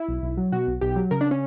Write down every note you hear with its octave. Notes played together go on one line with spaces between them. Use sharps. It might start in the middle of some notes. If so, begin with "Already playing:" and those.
Already playing: E4
B1
B1
F#3
B2 F#4
B1
B1 G4
F#3
C#3 A#4
D4
C#4